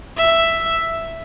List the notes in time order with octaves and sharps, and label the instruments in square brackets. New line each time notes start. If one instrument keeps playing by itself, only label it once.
[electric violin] E5